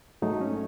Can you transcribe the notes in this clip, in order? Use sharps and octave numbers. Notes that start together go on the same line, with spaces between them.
G#2 F#3 A3 D#4
C#4